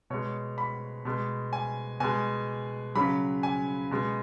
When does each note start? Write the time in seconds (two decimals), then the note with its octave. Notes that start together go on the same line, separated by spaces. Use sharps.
0.10 B2 G#3 C#5
0.58 B5
1.05 B2 G#3
1.53 G#5
2.00 B2 G#3 G#5
2.95 C#3 F#3 B5
3.43 G#5
3.91 B2 G#3